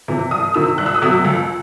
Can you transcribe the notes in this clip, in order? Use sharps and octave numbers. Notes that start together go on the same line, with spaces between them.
C3 E3
C2 D#6
C3 D#3 E6
C2 F#6
E6
D#6
C3 F#3 A3 E6
C#2